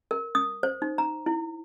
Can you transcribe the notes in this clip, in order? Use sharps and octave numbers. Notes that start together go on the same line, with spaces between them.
A#4
D#6
C5
D#4
A#5
E4